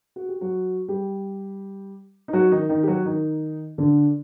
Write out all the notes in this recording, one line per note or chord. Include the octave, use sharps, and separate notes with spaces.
F#4
G4
F#3 F#4
G3 G4
D#4
F#3 F#4
D#3 D#4
D#3 D#4
G4
F#3 F#4
D#3 D#4
D3 D4